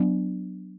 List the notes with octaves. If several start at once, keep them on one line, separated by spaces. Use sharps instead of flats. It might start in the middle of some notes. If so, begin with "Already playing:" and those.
Already playing: F#3 B3 D4